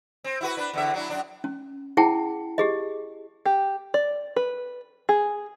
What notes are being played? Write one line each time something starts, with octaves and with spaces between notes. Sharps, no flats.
C4
E4 F#4 B4
D4 B4
E2 D3 E5
F#3 D4 E4
F#2 D4
C#4
E4 G#4 F#5 G5 A5
G4 G#4 D#5
G4
D5
B4
G#4